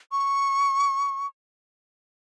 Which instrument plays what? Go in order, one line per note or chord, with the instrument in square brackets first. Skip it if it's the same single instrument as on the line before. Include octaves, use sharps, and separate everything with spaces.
[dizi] C#6